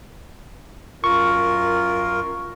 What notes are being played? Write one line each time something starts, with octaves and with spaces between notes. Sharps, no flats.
F#2 F4 A#4 C#6